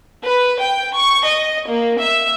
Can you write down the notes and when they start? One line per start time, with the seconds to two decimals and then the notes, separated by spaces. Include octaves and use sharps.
0.24 B4
0.61 G5
0.95 C#6
1.26 D#5
1.68 A#3
1.99 E5